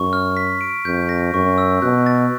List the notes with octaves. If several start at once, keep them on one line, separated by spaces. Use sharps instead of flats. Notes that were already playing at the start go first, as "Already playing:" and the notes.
Already playing: F#2 C#6
F6
B6
D7
F2 G6
A#6
F#2 C#6
E6
B2 F#6
A6